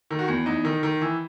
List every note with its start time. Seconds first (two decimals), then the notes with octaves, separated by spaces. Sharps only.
0.11 D#3
0.19 F#4
0.28 E2
0.46 E2 D#4
0.65 D#3
0.83 D#3
1.01 E3